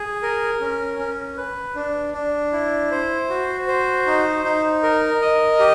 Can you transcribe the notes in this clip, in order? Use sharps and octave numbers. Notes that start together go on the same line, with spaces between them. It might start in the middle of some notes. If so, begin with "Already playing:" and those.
Already playing: G#4
A#4
C#4
C#4
B4
D4
D4
E4
C5
F#4
C5
D#4
D#4
A#4
D#5
G4